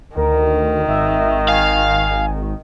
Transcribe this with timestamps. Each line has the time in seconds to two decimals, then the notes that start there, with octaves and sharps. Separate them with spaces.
0.17 D2 D#3 A#4
0.88 G#1 E5
1.48 F5 G#5